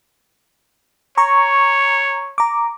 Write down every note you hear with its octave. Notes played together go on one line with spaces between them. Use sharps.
C#5 A#5 C#6
A#5 D6